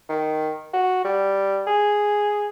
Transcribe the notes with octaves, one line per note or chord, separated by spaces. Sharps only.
D#3
F#4
G3
G#4